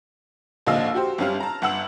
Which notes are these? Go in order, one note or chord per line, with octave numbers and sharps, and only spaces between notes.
A#1 D#2 D3 D#5 F5 E6
F#4 G4 C5
G1 G3 C#4 F5 F6
A5 A#5
G1 F#5 E6 F#7